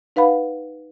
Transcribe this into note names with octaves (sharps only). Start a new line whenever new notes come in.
D#4 B4 F5 F#5 B5